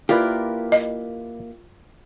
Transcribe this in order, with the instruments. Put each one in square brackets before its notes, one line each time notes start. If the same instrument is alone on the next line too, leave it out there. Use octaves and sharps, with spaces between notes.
[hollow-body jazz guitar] A#3 E4 G4 [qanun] F4 A#4 [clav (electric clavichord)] B4 D5 F5
[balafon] D#5